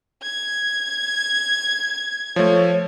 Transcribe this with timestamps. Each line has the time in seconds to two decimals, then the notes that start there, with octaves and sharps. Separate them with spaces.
0.22 G#6
2.36 F3 A3 C#5